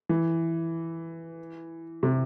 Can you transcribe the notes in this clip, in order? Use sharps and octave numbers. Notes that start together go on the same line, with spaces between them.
E3
C3